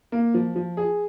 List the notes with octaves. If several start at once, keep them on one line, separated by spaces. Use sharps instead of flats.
A#3
F3
F3
G#4